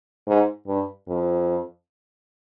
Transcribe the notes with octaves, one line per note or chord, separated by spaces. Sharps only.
G#2
G2
F2